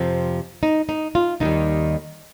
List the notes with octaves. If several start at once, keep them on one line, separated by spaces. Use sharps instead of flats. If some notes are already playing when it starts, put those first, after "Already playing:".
Already playing: F2 C3 F3 C4
D#4
D#4
F4
D#2 D#3 G3 D#4